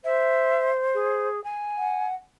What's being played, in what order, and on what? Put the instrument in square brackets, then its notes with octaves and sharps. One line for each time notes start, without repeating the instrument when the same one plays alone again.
[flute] C5 [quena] E5
[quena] G#4
G#5
[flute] F#5